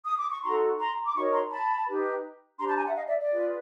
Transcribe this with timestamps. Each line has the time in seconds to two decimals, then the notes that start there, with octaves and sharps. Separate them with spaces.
0.05 D#6
0.18 D6
0.31 C#6
0.43 D#4 F#4 A4 A#5 C6
0.79 A#5 C6
1.06 D6
1.15 D#4 F#4 A#4 C#5 B5 C#6
1.33 A#5 C6
1.51 A5 B5
1.87 D#4 G4 B4
2.58 D4 G4 C5 A#5 C6
2.68 A5 B5
2.77 G#5 A#5
2.86 E5 F#5
2.95 D#5 F5
3.07 D5 E5
3.19 D5
3.31 F4 G#4 B4